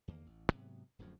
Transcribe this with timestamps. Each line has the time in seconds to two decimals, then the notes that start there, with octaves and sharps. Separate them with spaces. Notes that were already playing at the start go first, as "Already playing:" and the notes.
0.08 E2 D#3 A#3
0.26 A1
0.51 G#2 C3 F#3 B3
0.99 D1 F#2 A2 F3